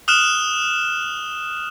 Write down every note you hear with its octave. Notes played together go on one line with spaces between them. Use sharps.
D#6 F6 F#6 E7 G7